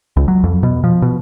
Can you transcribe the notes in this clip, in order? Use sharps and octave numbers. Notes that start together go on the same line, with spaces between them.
C#2
F#3
F2
B2
F3
B2